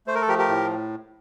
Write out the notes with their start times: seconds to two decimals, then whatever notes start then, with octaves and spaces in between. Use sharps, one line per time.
0.07 A3 C5
0.15 A#4
0.22 A4
0.28 F3 G4 A#4
0.39 G4 A#4
0.49 A2